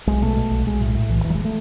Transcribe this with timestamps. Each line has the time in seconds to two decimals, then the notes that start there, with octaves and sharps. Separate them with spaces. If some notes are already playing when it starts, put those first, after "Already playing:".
0.07 B1 G#3
0.22 B2 A3
0.37 B2
0.51 B1
0.67 B1 G#3
0.81 A2
0.95 A2
1.09 B1 E3
1.24 E1 E3
1.30 F#3
1.35 G#3
1.45 A3